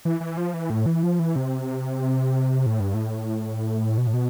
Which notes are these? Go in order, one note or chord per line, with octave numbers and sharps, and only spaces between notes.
E3
E3
F3
E3
A2
E3
F3
E3
C3
A2
G2
A2
B2
A2
B2